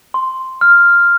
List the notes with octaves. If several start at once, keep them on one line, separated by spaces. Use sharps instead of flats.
C6
F6